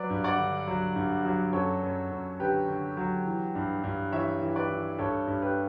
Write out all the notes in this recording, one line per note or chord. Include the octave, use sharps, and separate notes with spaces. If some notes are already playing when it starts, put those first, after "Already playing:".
Already playing: F#3 B4 D5
G2
D5 F#5
D3
F#3
G2
F#3
F#2 A4 C#5
F#2
F#2
D3 G4 B4
D3
F#3
E3
G2
G2
E3 C#5 E5
E3
B4 D5
E3
G2 A4 C#5
G2
G4 B4